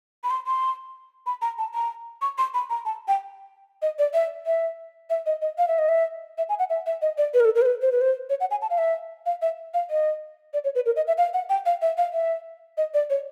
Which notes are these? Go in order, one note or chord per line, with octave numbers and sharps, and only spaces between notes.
B5
C6
C6
B5
A#5
A5
A#5
C#6
C6
B5
A#5
A5
G5
D#5
D5
E5
E5
E5
D#5
D#5
F5
E5
D#5
E5
E5
G#5
F#5
E5
E5
D#5
D5
B4
A#4
A4
A#4
C5
B4
C5
B4
C5
C#5
F#5
G#5
A5
F5
E5
F5
E5
F5
D#5
D5
C#5
B4
A#4
D#5
E5
F5
F#5
G5
F5
E5
F5
E5
D#5
D5
C#5